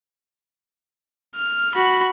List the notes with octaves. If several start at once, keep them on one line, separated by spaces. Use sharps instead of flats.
F6
F#4 B5